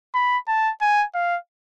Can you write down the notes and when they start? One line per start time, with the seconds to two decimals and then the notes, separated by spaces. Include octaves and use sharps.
0.15 B5
0.48 A5
0.82 G#5
1.14 F5